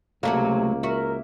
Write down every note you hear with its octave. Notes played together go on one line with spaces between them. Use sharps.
C#2 C3 F#3 A3 A#3 F#4
F#4 A#4 E5